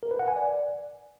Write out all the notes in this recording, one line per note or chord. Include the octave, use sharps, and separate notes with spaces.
A#4
B4
F#5
G#5
D5